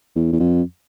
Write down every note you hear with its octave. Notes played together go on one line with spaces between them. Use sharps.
E2
E2
F2